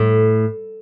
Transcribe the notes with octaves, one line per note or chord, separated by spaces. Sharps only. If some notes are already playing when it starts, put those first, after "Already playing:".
Already playing: A2